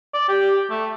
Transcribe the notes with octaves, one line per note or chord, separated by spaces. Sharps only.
D5
G4
A3